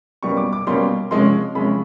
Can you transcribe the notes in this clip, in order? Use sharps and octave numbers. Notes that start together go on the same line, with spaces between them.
B2 G3 A#3 C#4 C#6
D6
D6
B2 G3 A#3 C#4 C6
C3 F3 G#3 C#4 C6
C3 F3 G#3 C#4 B5